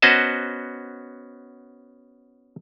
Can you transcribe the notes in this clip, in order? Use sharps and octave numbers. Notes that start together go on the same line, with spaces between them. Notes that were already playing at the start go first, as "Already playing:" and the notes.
B3 C#4 F#4 C5 D#5 A5